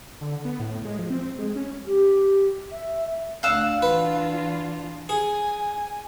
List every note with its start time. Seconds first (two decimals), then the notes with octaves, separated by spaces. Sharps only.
0.21 D3
0.45 B3
0.60 A2
0.85 G#3
0.98 F3
1.10 C4
1.39 G#3
1.56 C#4
1.87 G4
2.72 E5
3.43 D2 D5 F5 F#5 E6
3.82 E3 D4 F4 B4
5.09 G#4 G#5